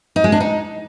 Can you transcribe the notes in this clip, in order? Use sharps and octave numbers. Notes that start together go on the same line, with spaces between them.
D#4
G#3
D4
D#4